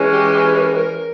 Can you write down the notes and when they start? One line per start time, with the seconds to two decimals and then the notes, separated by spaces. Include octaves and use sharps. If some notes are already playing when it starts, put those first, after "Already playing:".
Already playing: E3 G#3 C#4
0.10 G4
0.33 G4
0.55 A#4
0.78 A#4